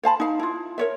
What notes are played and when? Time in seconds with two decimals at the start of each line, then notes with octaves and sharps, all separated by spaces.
0.03 C5 F5 A5 B5
0.20 D#4 F5
0.39 E4 F4
0.78 A#4 C#5 E5